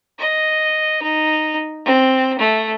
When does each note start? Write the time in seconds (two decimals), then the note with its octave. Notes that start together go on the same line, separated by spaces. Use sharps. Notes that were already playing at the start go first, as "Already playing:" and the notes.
0.19 D#5
1.02 D#4
1.85 C4
2.39 A3